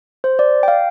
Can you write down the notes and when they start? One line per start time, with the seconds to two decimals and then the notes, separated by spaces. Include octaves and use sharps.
0.24 C5
0.39 D5
0.63 G5
0.68 F5